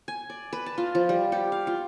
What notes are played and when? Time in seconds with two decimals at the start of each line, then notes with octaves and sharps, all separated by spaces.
0.08 G#5
0.30 D5
0.53 B4
0.66 A5
0.78 F4
0.95 F3
1.09 G3
1.32 G4
1.52 F5
1.67 F4